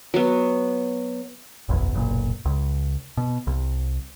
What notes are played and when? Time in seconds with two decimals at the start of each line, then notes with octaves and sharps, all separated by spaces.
0.14 F#3 B3
1.69 F#1 B1 E2
1.94 F#1 B1 A#2
2.45 C#2
3.17 B2
3.47 C2